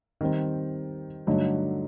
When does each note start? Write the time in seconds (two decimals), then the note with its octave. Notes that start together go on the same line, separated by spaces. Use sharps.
0.21 D#3 G3 C4
1.27 G2 D3 F#3 A3 D#4